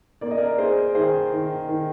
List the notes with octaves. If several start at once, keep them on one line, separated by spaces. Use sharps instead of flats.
A#3 D5
D#5
A#4 D5
A#3 G#4 C5
D#3 G#4 C5
D#3
D#3